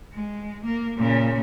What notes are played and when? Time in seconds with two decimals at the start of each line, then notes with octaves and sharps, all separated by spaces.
0.13 G#3
0.65 A#3
0.97 A#2 C#3